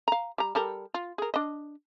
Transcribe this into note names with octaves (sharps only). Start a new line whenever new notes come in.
F5 A#5
G3 A#5
G3 A4 A#4
F4
G#4 A#4
D4 D#5